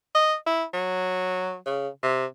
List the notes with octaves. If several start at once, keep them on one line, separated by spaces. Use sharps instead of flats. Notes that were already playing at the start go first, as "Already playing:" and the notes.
D#5
E4
F#3
C#3
C3